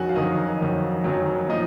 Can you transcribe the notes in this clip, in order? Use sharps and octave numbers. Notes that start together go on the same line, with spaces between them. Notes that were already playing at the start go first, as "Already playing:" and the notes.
Already playing: F2 D#3 F#3 F#4 G#4 F#5 G#5
F5
F2 D#3 F#3 D#4 D#5
F2 D#3 F#3
F2 D#3 F#3
A#2 F3 D#4 D#5